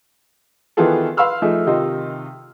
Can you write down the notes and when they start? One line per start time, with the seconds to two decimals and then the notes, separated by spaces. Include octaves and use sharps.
0.77 D#3 E3 B3 F4 G#4 A4
1.17 B4 F5 B5 C6 E6 F6
1.42 F3 A3 D#4 G#4
1.66 C3 D#3 D#4 F4